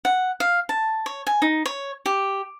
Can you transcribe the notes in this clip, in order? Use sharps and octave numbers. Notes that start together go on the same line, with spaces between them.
F#5
F5
A5
C#5
G#5
D#4
C#5
G4